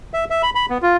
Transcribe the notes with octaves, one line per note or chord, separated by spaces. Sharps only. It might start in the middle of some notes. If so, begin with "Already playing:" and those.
E5
E5
B5
B5
B3
F4